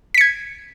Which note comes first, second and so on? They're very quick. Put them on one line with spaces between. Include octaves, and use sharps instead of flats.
B6 C#7 G#6